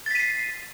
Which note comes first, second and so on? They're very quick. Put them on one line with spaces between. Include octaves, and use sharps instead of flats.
A6 B6 D#7 C7